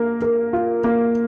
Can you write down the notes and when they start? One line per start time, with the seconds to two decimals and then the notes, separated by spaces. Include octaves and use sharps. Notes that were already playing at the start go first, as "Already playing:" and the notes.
Already playing: A#3 A#4
0.22 A#4
0.53 F4
0.84 A#3